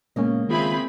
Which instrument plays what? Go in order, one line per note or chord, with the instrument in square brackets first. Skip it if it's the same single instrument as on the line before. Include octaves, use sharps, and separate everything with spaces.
[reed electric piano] A#2 C#4 [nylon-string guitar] C#3 A#3 D#5 [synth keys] G#3 B3
[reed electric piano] D#3 F4 E5 [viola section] C4 G#4 B5